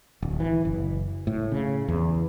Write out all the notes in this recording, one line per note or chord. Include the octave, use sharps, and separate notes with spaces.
D1
E3
F#1
A2
C#3
E2